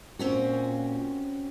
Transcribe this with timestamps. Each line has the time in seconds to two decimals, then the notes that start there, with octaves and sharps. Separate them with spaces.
0.19 A#2 C4 C#4 F#4